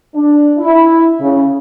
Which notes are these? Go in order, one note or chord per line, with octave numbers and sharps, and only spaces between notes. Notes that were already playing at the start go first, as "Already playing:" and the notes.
D4
E4
C#3